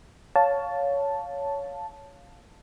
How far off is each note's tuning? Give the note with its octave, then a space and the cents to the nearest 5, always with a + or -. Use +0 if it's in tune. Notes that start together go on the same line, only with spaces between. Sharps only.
C#5 +15 F5 +10 A5 +0